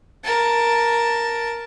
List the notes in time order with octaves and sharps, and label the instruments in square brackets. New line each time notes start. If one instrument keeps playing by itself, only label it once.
[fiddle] A#4 A5